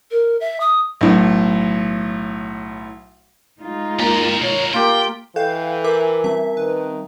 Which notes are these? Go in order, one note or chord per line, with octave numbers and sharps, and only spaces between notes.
A#4
E5
D#6
B1 A2
G#3 D#4 F4
A#3 G4 A#4 A#5
B2 A#4 C#5
A#3 F4 G4 G5
E3 A4 F5 G5 G6
A#4 E5 G#5 D6
G3 C4 E5
D#3 B4